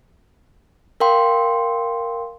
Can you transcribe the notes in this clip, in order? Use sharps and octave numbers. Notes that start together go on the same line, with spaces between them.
A#4 F5 G5 C6